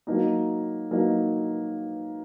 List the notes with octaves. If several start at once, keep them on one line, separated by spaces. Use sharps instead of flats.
F#3 A#3 D#4
F#3 A#3 D#4